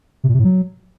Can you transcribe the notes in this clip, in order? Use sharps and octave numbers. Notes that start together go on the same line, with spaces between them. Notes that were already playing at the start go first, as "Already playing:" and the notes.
C3
A#2
C3
A2
F#3